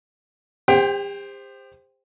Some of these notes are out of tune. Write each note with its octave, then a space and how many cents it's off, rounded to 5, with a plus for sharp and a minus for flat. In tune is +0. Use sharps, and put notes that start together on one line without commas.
G4 +40 C5 +0 G5 +0